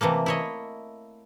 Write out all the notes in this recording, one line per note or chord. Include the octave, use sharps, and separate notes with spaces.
C3 E3 A3 A#3
E4 C#5 D#5